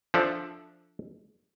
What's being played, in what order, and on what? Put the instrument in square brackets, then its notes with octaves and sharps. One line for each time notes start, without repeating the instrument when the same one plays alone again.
[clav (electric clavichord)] F3 D4 A4 D5 E5